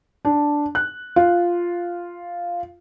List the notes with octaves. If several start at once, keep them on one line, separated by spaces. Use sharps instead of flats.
D4
F#6
F4